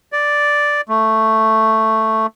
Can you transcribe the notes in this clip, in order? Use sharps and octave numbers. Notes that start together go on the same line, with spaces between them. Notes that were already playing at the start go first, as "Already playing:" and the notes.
D5
A3